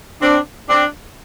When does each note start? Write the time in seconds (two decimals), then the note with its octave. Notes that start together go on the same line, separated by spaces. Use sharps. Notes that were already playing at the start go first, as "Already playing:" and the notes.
0.21 C4 D4
0.69 C4 D4